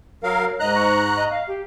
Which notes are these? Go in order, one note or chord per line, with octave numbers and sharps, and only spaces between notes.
F#3 A#4 F5
G#2 D#5 A#5 F#6
C#6
D#5
F5
G4